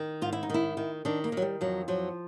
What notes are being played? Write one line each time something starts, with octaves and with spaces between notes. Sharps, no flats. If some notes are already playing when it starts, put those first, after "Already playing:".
Already playing: D#3
G#2 F4
E4
D#4
D#3 E4
D#3
D#3 D4
A#3
D#3 F#3
G3
F2 F#3
F3 F#3